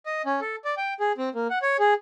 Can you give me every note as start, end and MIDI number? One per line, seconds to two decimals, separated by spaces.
0.06 0.22 75
0.26 0.40 61
0.41 0.56 69
0.65 0.75 74
0.77 0.94 79
1.00 1.12 68
1.18 1.29 60
1.35 1.47 58
1.50 1.59 78
1.62 1.77 73
1.79 1.94 68